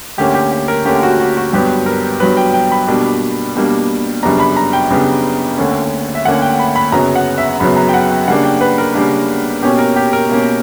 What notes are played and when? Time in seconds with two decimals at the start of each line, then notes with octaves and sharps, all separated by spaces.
0.18 D2 D3 A#3 C#4 G4
0.34 G4
0.51 G4
0.68 A#4
0.85 D2 D3 A#3 C#4 G4
1.03 F#4
1.20 F#4
1.37 F#4
1.53 G2 F#3 B3 G4
1.86 A#4
2.20 G2 F#3 B3 B4
2.37 G5
2.54 G5
2.72 B5
2.88 B2 G3 A#3 D4
3.55 B2 G3 A#3 D4
4.23 F#2 C#3 G3 B3 D4 A#5
4.40 B5
4.57 A#5
4.73 G5
4.90 F#2 C#3 G3 B3 D4
5.58 D2 D3 A#3 C#4
6.15 E5
6.25 D2 D3 A#3 C#4 F#5
6.42 G5
6.59 B5
6.76 B5
6.92 F#2 C#3 F#3 B3 A#5
7.16 F#5
7.38 E5
7.60 F#2 C#3 F#3 B3 B5
7.77 A#5
7.89 G5
7.94 F#5
8.10 G5
8.28 C#3 G3 A#3 D4 F#5
8.45 G5
8.61 B4
8.78 A#4
8.94 C#3 G3 A#3 D4
9.63 B2 A#3 C#4 G4
9.79 A#4
9.96 G4
10.13 A#4
10.29 B2 A#3 C#4